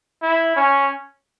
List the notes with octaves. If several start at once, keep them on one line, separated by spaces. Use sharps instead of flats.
E4
C#4